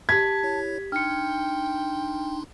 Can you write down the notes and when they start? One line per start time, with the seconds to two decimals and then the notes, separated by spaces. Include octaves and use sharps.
0.09 G4 A5 G#6 B6
0.43 E4 C#5
0.92 D4 D#4 G5 C6 F6 C#7